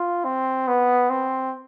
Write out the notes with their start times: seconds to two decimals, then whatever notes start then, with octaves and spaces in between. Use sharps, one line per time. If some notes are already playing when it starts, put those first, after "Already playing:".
Already playing: F4
0.24 C4
0.68 B3
1.10 C4